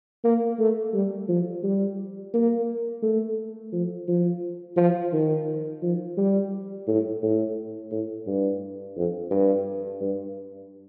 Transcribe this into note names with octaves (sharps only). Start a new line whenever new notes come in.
A#3
A3
G3
F3
G3
A#3
A3
F3
F3
F3
D#3
F3
G3
A2
A2
A2
G2
F2
G2
G2